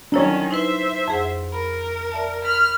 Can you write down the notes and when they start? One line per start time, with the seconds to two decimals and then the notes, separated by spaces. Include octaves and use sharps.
0.12 D#3 F#3 C#4 D4 E4 C#5 A#5
0.51 D#4 E4 B4 C5 E5
1.08 F2 G#4 F#5
1.52 A#4 B5
2.12 D5 E5 A5
2.43 A#4 B5 F6